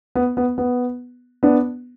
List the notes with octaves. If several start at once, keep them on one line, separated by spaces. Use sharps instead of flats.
B3
B3
B3
B3 D4